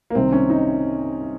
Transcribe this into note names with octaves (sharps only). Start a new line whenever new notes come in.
A#3
C2 C3 D#3 C4
C#4
D#4